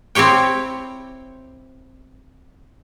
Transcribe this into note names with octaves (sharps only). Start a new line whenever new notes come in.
C4 E4 G4 C#5 G5